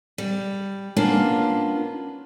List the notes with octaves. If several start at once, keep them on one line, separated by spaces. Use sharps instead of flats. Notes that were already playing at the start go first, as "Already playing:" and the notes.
G3
A#3 B3 C#4 D4 F4